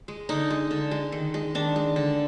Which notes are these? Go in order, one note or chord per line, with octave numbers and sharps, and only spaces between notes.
G#3
D3 D#4
G#3
D3
G#3
D#3
G#3
D#3 D4
G#3
D3